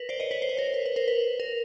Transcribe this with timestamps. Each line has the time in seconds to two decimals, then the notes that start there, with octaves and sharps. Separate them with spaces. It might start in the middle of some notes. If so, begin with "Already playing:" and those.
Already playing: A#4 B4
0.09 C5 D5
0.20 C#5 D#5
0.31 B4 C#5
0.42 C5
0.49 C#5
0.57 A#4 C5
0.74 B4
0.86 B4
0.96 A#4 C5
1.08 B4
1.40 A#4